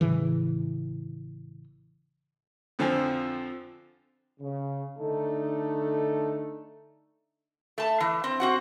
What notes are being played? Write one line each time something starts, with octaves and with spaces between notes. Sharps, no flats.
A#1 A2 C#3 E3
F2 D3 F3 C4 G#5
C#3
D3 A3 D4 D#4 A4
A3 A5
E3
C4
C4 F#4 F#5